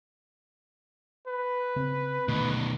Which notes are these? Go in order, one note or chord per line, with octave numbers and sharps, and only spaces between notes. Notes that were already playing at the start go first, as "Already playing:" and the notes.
B4
C#3 C4
B2 D3 D#3 A3